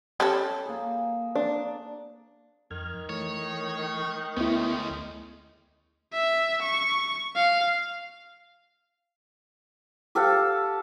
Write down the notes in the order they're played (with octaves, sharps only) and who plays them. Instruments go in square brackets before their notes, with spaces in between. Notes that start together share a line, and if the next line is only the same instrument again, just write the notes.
[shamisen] G3 C#4 A4
[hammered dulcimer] A#3 G#4
[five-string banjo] D4
[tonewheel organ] F2 F6 G#6 [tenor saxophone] D#3
[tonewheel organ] E3 A3 [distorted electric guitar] C#5
[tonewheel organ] D2 A3 D#5 [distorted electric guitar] G#3 C#4 [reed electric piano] B3 E4
[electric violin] E5
C#6
F5
[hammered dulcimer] G4 A4 F5 F#5